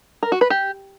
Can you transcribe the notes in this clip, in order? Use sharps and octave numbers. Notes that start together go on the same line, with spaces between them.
A#4
F#4
B4
G4